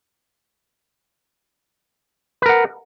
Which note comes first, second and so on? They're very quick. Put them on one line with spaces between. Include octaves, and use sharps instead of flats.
B4 A#4 F#5